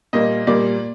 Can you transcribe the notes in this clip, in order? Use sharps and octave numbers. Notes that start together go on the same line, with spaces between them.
A#2 G3 A#3 D#5
A#2 G3 A#3 D5